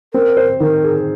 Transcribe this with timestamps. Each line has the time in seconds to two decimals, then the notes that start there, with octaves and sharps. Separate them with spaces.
0.14 C4 A#4
0.37 C5
0.60 D#3 A#4
0.84 G#4